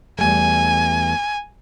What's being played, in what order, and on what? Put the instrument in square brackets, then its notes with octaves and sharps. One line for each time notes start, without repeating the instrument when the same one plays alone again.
[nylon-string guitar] E2 G3 A3 [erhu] G#5